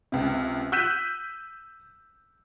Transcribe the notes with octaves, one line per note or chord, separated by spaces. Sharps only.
C#2 C3
E6 F#6 G6 B6 D#7 E7